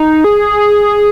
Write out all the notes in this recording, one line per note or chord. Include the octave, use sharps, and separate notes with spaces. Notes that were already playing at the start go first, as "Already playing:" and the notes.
Already playing: D#4
G#4